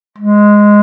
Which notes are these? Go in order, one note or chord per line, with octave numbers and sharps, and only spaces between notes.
G#3